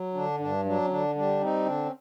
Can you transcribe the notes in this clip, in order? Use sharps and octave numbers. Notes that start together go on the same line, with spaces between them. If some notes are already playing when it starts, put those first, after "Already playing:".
Already playing: F#3
D3 D4
G2 D4
F#3 D4
C#4
D3 D4
G3 D4
C4 D#4
D3 D4
C#4